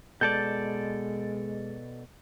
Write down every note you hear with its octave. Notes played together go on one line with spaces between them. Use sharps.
B2 G#3 A4 D5 G6